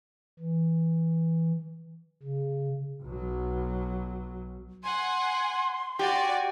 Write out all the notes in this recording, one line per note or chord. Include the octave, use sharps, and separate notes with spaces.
E3
C#3
B1 F#3
F#5 G#5 C6
F#4 G4 D5 G#5